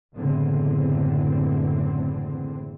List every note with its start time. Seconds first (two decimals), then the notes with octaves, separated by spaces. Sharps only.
0.14 F#1 E2 A2 D3 E3 C4